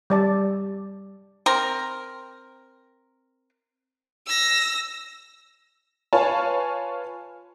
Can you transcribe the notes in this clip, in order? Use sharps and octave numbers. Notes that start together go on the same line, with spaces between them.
G3 D5 A5
C4 A#4
E6 A#6
F4 B4 C#5 F5 G#5 A5